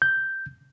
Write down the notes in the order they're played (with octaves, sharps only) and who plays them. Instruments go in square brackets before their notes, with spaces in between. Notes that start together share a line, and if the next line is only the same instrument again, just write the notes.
[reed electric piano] G6